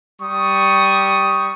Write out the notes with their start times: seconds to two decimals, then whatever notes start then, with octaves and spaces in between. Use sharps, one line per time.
0.21 G3 C#6 D#6